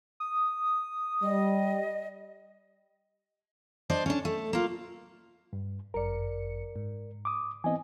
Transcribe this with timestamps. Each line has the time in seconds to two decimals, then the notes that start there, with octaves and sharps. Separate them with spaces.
0.20 D#6
1.23 G3 D#5
3.90 D4 C5 D5 D#5
4.06 C#4 D4
4.25 A3
4.53 A#3 F4
5.53 G2
5.94 G1 F#2 A#4 D5 C#7
6.76 G#2
7.25 D6 D#6
7.64 E3 B3 C4 D#5 G#5